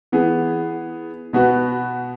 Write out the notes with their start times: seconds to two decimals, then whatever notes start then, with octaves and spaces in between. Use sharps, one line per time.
0.12 E3 B3 G#4
1.33 B2 B3 F#4 B4